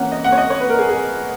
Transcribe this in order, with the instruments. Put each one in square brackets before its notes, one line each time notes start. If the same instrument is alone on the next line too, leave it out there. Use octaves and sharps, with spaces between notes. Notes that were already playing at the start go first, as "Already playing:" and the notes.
Already playing: [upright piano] E3 A#3 C#4 F#5
D#5
F#5
C#5
D#5
C#5
B4
A#4
G#4
G#4